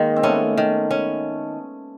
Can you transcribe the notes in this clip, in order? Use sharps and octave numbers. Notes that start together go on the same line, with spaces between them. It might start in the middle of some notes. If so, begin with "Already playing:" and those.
Already playing: D#3 G#3 A#3
C4
A3 B3 C#4
D#3
C#4